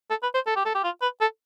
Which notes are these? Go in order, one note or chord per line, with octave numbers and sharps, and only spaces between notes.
A4
B4
C5
A4
G4
A4
G4
F4
B4
A4